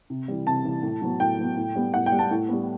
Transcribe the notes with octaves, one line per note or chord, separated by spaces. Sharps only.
C3
E3 G3
C3 A5
E3 G3
A2
F#3 B3
A2 G5
F#3 B3
A2
G3 B3
A2 F#5
G5
G3 B3
A5
A2
G3 B3